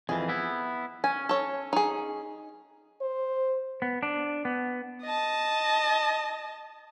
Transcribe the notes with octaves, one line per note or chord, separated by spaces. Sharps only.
F2 E3 G#4
B3 E4
C#4 G#5
A4 C#5
D#4 G#4
C5
B3
D4
B3
D#5 A5